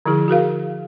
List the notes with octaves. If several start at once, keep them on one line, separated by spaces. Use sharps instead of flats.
D3 F3 E4 G#4
F#4 G#4 A#4 F5